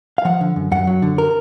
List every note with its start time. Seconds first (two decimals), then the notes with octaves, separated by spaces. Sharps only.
0.18 F5
0.25 F3 F#5
0.41 D3
0.56 F#2
0.72 F#2 F#5
0.87 F#3
1.02 D3
1.18 A#4